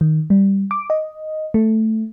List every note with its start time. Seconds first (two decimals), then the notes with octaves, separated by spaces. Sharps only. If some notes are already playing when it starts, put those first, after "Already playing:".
0.01 D#3
0.30 G3
0.71 D6
0.90 D#5
1.54 A3